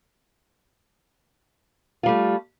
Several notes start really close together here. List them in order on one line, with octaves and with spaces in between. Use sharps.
F4 G3 A3